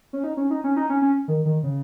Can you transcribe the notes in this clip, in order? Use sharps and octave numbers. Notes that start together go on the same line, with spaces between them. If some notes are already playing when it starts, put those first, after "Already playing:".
C#4
D#4
C#4
D#4
C#4
D#4
C#4
C#4
D#3
D#3
C#3